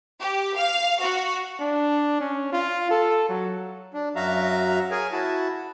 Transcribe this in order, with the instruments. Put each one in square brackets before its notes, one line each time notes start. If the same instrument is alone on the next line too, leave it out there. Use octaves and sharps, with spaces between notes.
[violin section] G4
F5
F#4
[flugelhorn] D4
C#4
F4
A4
F#3
[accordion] D4
F#2 F#3 F#4 E5 F5 A#5
G#4 A#4 C#5 G#5
E4 F#4 A5